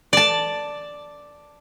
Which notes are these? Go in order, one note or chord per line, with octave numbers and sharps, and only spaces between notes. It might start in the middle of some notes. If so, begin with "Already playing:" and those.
D5 A5